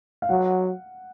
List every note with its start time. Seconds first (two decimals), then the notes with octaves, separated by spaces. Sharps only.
0.22 F5
0.29 F#3 F#5